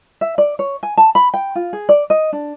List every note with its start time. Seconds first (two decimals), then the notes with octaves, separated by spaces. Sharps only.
0.21 E5
0.38 D5
0.59 C#5
0.83 G#5
0.97 A5
1.15 B5
1.34 G5
1.55 F4
1.73 G#4
1.89 D5
2.10 D#5
2.33 D4